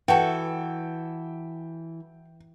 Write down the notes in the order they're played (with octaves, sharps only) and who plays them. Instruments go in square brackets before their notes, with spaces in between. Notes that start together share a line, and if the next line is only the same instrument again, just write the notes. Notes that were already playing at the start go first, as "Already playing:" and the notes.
[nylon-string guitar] E3 [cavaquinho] F#4 A4 [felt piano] G5